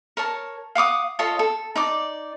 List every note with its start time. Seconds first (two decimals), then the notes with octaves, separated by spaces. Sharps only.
0.17 A#4 C#5 A5
0.75 F5 F#5 D6 D#6
1.19 F4 A4 C#5 D#5
1.39 A4
1.76 D#4 D5 D6